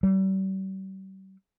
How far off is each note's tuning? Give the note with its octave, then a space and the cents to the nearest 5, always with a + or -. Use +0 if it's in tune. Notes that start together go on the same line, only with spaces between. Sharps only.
G3 -40